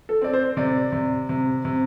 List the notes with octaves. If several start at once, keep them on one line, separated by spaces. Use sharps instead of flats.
A4
C4 D5
C5
C3 D5
C3
C3
C3